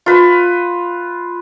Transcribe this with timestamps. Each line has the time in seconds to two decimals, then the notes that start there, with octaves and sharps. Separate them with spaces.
0.06 F4 B4